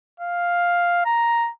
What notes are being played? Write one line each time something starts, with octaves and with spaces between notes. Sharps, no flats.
F5
A#5